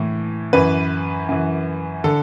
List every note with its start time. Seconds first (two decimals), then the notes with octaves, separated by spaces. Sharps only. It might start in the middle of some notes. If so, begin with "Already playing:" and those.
Already playing: A2 E3
0.53 F#2 E3 B4
1.29 F#2 E3
2.04 D3 A4